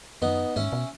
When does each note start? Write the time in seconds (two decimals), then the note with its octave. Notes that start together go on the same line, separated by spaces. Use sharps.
0.22 F#2 B3 D#4
0.56 G#2 C#4 E4
0.72 B2